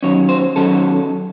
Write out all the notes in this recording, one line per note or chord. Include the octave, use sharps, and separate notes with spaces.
D#3 F#3 C#4 C#5
C5
D#3 F#3 C#4 A4